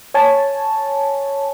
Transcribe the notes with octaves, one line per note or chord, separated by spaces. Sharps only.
C#5 G#5 A5